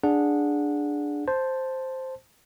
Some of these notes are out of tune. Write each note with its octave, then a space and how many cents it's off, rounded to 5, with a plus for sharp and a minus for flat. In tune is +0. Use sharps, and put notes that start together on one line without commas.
D4 +0 G#4 +0 F#5 -20
C5 +0 A5 +0